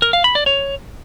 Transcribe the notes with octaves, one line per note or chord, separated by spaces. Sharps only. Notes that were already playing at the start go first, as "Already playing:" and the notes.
A#4
F5
B5
D5
C#5